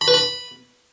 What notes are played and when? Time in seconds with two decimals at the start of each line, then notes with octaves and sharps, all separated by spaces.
0.01 B5
0.08 B4
0.14 B5